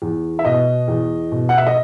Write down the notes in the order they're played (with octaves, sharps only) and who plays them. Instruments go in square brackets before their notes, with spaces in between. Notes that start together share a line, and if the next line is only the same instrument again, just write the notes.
[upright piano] E2
E5
B2 D#5
E2
B2
F#5
E5
D#5